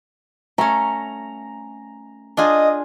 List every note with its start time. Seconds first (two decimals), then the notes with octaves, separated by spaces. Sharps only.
0.58 A3 C#4 A#5
2.37 D4 F4 G#4 D#5